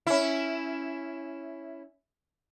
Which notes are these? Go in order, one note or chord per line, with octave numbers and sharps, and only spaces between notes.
C#4 E4